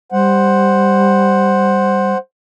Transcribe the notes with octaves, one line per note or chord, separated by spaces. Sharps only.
G3 C5 F#5